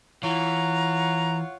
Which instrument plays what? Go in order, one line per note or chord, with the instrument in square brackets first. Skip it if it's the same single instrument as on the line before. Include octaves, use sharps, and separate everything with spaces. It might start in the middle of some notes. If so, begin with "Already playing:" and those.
[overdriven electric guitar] E3 [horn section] F4 C#5 F#5 [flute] A#5